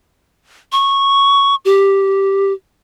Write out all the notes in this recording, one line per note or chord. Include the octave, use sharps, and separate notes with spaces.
C#6
G4